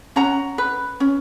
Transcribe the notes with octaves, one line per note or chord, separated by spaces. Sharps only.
C#4 F#5 A#5
B4
C#4